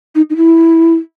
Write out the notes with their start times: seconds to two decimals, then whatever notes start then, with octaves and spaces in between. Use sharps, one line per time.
0.15 D#4
0.30 D#4
0.36 E4